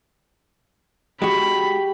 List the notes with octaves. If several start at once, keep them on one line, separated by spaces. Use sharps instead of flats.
G#3 F#4 G4 B5